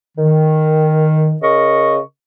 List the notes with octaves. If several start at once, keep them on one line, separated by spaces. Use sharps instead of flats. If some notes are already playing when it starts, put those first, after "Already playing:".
D#3
C#3 A#4 D#5 C#6